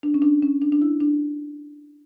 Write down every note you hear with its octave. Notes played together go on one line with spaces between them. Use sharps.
D4
C#4
D4
C#4
D4
D4
E4
D4